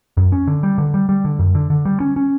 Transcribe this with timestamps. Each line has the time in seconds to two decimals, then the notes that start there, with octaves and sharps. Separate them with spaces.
0.17 F#2
0.32 C#4
0.47 D3
0.63 G3
0.78 D3
0.94 G3
1.09 G3
1.25 D3
1.39 F#2
1.55 D3
1.70 D3
1.85 G3
2.00 C#4
2.16 C#4